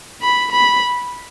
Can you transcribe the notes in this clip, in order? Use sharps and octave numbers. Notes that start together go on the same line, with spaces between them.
B5
B5